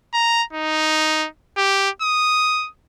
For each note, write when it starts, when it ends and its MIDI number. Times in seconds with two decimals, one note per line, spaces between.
0.14 0.43 82
0.53 1.28 63
1.57 1.90 67
2.02 2.69 87